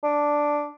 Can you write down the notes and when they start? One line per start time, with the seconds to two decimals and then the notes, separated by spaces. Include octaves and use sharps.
0.03 D4